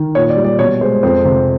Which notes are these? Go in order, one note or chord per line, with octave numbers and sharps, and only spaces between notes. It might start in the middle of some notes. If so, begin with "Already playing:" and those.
Already playing: D#3
A#2 C#5
D5
G3
D5
B2 C#5
G#3 C5
F2 C5
C3